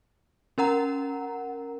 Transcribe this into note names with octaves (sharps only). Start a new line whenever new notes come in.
C#4 A#4 F#5 A#5